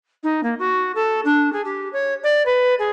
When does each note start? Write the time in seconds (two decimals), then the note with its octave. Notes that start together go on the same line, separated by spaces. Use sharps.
0.23 D#4
0.43 A#3
0.59 F#4
0.95 A4
1.25 D4
1.53 G#4
1.65 G4
1.93 C#5
2.24 D5
2.46 B4
2.79 G#4